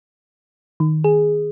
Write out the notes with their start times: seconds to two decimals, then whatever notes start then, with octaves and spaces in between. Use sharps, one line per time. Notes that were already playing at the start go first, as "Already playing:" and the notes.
0.80 D#3
1.04 G#4